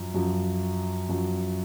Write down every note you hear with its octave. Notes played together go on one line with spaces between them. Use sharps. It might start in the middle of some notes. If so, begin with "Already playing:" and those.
Already playing: F#2 F3
F#2 F3
F#2 F3